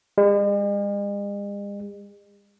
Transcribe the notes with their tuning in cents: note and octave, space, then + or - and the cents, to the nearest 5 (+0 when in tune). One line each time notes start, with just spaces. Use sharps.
G#3 -45